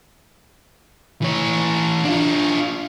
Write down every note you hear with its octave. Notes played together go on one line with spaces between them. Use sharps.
E3 C#5
D4 F4